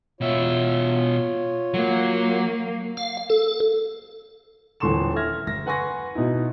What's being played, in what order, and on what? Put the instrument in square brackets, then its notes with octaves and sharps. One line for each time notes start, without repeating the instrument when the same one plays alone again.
[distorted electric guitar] B2 E5 [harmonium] F4 C#5
[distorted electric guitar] F#3 [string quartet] A#3
[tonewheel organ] F5
A4
[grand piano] D#1 D3 E3 C6 C#6 E7
E5 F6 G#6 A#6
F#1 A#6
B4 F#5 G#5 C6 C#6 A#6
B2 D#4 E4